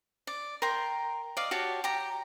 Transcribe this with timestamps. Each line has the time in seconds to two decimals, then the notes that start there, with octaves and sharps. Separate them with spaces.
0.27 D5
0.62 A#4 G5 C6
1.37 D5 D#5 F5
1.51 F#4 G4 C#5 A5
1.84 G4 A#5